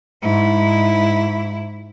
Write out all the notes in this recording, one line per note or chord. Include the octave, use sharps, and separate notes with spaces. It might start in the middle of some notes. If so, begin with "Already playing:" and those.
G#2 E4